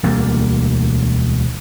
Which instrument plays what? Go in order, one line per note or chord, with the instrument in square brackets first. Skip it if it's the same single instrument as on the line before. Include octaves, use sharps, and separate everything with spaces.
[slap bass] E1 D2 G3 A#3